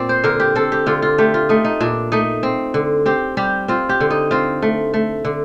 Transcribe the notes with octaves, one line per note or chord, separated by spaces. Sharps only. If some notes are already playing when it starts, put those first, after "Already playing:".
Already playing: A#2 C4 D5
C5
D3 A#4
G4
C4 A4
G4
D3 F4
F4
A3 G4
F4
A3 D#4
D#4
A#2 D4
A3 D#4
C4
D3
C4 G4
G3 G4
C4 F4
G4
D3
D#4
C4 F4
A3
A3
D3